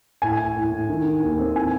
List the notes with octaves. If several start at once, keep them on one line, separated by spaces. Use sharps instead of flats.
A2 G#5
A2
A2
A2
D#3
D#3
D#2
C4
E3 G#5